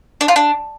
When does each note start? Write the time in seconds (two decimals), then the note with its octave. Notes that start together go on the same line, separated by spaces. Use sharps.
0.21 D4
0.28 F4
0.36 D4